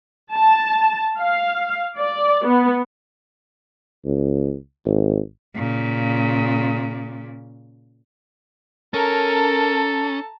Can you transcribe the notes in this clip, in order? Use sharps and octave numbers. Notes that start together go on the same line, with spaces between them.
A5
F5
D5
B3
C#2
G#1
A#2 C#3
C#4 A4 A#4 A5 A#5